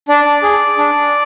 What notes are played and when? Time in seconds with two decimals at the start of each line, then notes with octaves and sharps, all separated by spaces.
0.08 D4 D5
0.43 G#4
0.78 D4